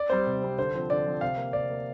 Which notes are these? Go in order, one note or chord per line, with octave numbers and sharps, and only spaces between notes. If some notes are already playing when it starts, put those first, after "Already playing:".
Already playing: D5
G3 C4 C5
C3
G3 C4
D3 C5
F3 C4
D3 D5
F3 C4
C3 F5
A#3
C3 D5
A#3